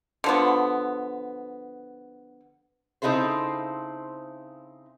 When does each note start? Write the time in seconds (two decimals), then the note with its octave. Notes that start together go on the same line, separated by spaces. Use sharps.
0.24 D3 F3 B3
3.02 C#3 C4 D#4 E4 A4 C5